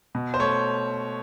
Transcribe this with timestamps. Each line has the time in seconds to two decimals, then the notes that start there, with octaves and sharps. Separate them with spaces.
0.15 B2
0.34 C5
0.39 A3 C#5